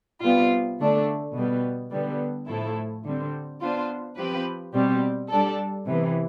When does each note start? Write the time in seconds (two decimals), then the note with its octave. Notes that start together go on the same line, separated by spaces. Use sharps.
0.23 C3 G3 B3 F4
0.79 D3 A3 D4
1.35 B2 G3 B3
1.92 D3 G3 B3
2.48 A2 F3 A3 E4 A4
3.05 D3 G3 C4
3.61 B3 D4 F4 C5
4.17 F3 C4 G4 B4
4.74 B2 G3 C4 G4
5.30 G3 D4 A4
5.86 C3 E3 B3